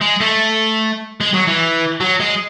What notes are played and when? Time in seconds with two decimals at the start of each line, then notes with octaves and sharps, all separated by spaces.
0.01 G#3
0.21 A3
1.21 G#3
1.34 F#3
1.48 E3
2.00 F#3
2.20 G#3